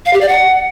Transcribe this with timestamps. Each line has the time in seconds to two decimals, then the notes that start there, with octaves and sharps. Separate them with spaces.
0.06 F5
0.13 G4
0.21 D5
0.29 F#5